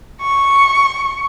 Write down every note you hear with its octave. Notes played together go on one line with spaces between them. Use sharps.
C#6